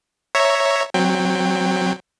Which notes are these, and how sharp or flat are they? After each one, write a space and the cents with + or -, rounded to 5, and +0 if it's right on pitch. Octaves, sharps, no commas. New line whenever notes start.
C#5 +0 E5 +0 A#5 +0
F#3 +0 C4 +0 G5 +20